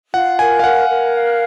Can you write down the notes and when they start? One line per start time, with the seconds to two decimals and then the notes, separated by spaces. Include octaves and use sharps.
0.14 F4 F#5
0.39 A#4 G#5
0.60 F5
0.64 A#4 F#5
0.90 A#4
1.15 F5